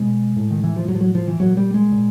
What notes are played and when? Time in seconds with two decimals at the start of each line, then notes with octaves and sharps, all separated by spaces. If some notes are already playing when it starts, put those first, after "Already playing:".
Already playing: B2 G#3
0.36 A2
0.51 D#3
0.64 E3
0.76 F3
0.88 A2 F#3
0.95 F3
1.01 F#3
1.15 F3
1.28 E3
1.40 A#2 F#3
1.57 G3
1.74 G#3
1.92 A#2